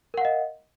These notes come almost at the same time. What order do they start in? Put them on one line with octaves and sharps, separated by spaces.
A#4 F#5 F5 D#5